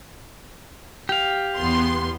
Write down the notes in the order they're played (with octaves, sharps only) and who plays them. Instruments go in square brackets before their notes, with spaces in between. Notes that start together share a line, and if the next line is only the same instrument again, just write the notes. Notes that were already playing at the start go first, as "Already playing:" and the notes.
[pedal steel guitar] G4 F5
[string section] E2 B3 C6